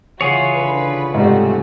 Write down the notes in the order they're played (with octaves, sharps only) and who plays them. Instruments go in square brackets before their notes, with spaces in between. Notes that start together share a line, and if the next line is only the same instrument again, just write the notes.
[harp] C#3 E3 [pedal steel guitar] F4 G#4 C#5 [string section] F#4
[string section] D3 B4
[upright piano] G#2 G3 [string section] C3 A3 F#4 [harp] D4